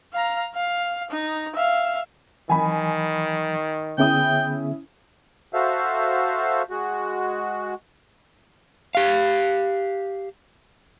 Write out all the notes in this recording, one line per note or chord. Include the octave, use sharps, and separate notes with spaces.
F5 A#5
F5
D#4
E5 F5
D#3 E3 F#3 G#5 B5
D3 B3 C#4 E4 G#4 G5 D#6
F#4 A4 C5 E5 F5
G#3 F#4
G4 F5